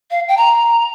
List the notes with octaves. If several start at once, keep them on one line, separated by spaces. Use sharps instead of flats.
F5
G5
A#5